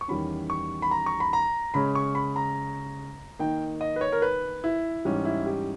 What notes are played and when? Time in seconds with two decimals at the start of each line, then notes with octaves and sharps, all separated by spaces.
0.01 C#6
0.08 E2 D#3 G3 C#4 B5
0.50 C#6
0.82 B5
0.91 A#5
1.06 C#6
1.20 B5
1.33 A#5
1.74 C#3 G#3 C#4 B5
1.95 C#6
2.15 B5
2.36 A#5
3.39 D#3 A#3 D#4 G5
3.81 D#5
3.96 B4
4.01 C#5
4.12 A#4
4.22 B4
4.64 E4
5.05 G#2 E3 G3 C#4
5.25 E4
5.46 G4